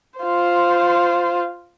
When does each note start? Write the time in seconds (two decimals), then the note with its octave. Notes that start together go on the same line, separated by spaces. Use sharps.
0.20 F4 C5